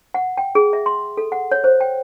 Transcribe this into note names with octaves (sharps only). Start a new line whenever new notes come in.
F#5
G5
G#4
E5
C6
A4
F#5
C#5
C5
G5